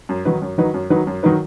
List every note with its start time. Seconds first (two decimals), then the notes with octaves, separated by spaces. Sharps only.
0.09 F#2
0.25 D#3 F#3 D#4 B4
0.42 F#2
0.58 D#3 F#3 D#4 B4
0.74 F#2
0.90 D#3 F#3 D#4 B4
1.07 F#2
1.23 D#3 F#3 D#4 B4